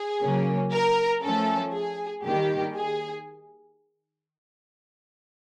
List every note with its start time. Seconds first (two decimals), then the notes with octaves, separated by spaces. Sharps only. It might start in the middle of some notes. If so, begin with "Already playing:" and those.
Already playing: G#4
0.22 C#3 F#3 A#3 C#4
0.73 A#4
1.23 F3 A3 C#4 A4
1.74 G#4
2.25 D#3 G3 A#3 G4
2.76 G#4